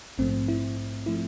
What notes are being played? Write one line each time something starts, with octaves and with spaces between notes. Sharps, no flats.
A#1 G#2 F3 A3 C4
E4
F3 A3 E4